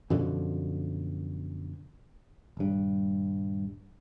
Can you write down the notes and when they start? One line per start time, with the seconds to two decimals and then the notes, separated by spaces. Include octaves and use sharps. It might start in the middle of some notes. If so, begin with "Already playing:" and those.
0.10 F#2 B2 D3 F3
2.57 D#1 G2